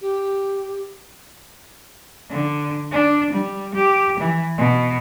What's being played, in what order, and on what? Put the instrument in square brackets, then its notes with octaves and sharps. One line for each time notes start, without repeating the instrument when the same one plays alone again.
[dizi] G4
[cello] D3
D4
G3
G4
E3
B2